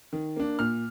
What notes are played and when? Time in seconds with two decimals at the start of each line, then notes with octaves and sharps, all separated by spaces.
0.13 D#3
0.36 A#3 D4
0.59 A#2 F6